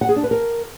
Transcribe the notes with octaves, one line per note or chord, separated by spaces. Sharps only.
F#5
G#4
D4
B4
A#4